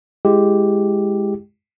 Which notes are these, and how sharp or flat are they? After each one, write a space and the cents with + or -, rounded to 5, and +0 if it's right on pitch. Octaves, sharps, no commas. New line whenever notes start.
G#3 +0 E4 +0 G4 +0